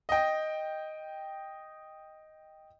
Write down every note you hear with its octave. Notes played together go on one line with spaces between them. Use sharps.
D#5 G5